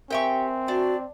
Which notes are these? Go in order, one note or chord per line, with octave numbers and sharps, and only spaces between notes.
C4 G4 A#4 E5 G5 G#5 C#6
D4 F#4